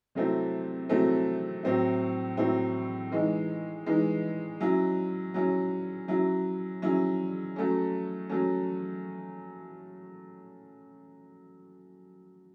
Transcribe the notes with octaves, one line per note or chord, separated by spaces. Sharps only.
C3 F#3 A3 C4 E4
C3 F#3 A3 C4 E4
A2 F#3 C4 E4
A2 F#3 C4 E4
E3 G#3 D#4
E3 G#3 D#4
F#3 C#4 E4
F#3 C#4 E4
F#3 C#4 E4
F#3 C#4 E4
F#3 A3 C#4
F#3 A3 C#4